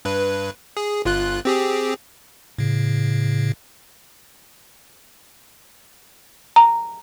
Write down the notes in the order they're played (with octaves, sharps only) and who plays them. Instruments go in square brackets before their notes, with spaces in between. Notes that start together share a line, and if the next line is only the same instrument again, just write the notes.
[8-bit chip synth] G2 B4
G#4
G1 F4 F#6
C4 G4 G#4
A2 C#3
[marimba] A#5